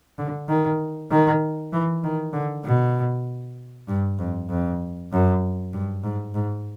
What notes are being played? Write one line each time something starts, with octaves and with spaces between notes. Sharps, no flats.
D3
D#3
D#3
E3
D#3
D3
B2
G2
F2
F2
F#2
G2
G#2
G#2